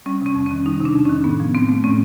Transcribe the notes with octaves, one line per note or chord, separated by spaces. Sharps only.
G3 C#4
C3 C#4
F2
D#3 C#4
G3 D#4
C3
D4
F2
D#3 C#4
A2 B3
F3
A2 C4
A3
A2 C#4